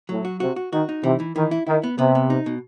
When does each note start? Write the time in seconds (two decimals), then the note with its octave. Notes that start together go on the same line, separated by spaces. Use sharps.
0.09 A2 F#3
0.25 F#4
0.40 C3 F#4
0.56 F#4
0.72 D#3 F#4
0.89 D#4
1.03 C3 E3
1.20 E3
1.35 D#3 E3
1.51 E4
1.67 D#3 E4
1.84 B3
1.98 C3 B3
2.15 B3
2.30 D#4
2.46 B2